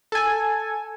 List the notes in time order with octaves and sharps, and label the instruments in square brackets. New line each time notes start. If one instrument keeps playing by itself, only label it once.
[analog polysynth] A4 G#5